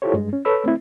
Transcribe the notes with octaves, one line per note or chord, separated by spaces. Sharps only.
E4 F4 G4 A4 C5 C#5
G2 G#3
C#4
A4 B4 C#5 B5 E6
A3 C4 E4